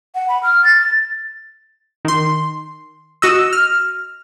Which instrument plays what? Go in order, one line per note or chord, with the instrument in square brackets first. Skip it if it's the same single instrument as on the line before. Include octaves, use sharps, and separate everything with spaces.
[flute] F#5
B5
F6
A6
[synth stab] D#3 C6
F#4 D#5 E6
F6